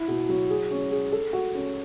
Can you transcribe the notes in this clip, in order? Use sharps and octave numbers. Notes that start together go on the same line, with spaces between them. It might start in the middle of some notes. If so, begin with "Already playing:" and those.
Already playing: E4
B2
F#3
G#4
C#4
G#4
A4
F#4
C#4